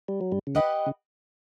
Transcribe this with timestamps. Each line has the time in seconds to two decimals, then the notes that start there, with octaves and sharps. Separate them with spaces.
0.08 G3
0.21 F#3
0.32 G2 G3
0.47 C#3
0.55 D2 D3 G4 B4 D#5 F#5
0.86 C#3